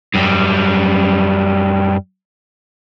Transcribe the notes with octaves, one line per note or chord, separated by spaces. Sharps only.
F#2 G3